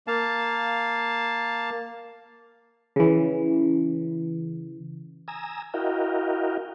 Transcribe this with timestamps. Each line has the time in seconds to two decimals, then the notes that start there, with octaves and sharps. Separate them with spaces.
0.07 A#3 F5 A5
2.96 C#3 E3
5.28 G#5 A#5 D#6 E6
5.74 E4 F#4 A#4 D#5 F5 G5